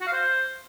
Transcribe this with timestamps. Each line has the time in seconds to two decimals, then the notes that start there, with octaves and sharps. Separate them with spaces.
0.01 F#4
0.07 F5
0.13 C5